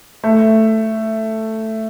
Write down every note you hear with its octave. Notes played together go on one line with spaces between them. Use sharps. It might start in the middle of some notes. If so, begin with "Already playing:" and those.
A3